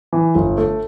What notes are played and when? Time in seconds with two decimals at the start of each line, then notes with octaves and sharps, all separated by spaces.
0.13 E3
0.35 G1
0.58 A3